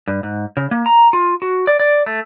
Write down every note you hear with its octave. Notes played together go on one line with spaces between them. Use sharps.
G2
G#2
C#3
A#3
A#5
F4
F#4
D5
D5
A3